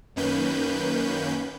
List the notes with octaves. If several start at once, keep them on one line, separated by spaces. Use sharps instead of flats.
F#2 D#3 A#3 C#4 B4 G6